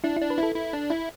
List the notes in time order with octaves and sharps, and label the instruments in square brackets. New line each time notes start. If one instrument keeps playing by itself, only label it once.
[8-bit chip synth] D4 [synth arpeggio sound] E4
[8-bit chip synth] D4 [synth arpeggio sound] E4
[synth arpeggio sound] B4
[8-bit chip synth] E4
[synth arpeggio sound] A4
[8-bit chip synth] E4
D4
E4